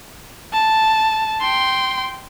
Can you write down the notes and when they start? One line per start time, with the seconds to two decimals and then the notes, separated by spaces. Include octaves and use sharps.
0.53 A5
1.41 G5 C6